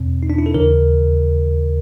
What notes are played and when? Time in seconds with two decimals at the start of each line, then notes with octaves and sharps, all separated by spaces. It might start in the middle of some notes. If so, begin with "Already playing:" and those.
Already playing: E2 B2 C4
0.23 D#4
0.30 D4
0.38 E4
0.46 A4
0.54 D#2 C#3 E3 A#4